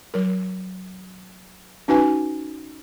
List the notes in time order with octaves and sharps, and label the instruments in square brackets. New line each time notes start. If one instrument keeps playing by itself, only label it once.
[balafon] F#3 A#4
C#4 D#4 F#4 B4 F5 G#5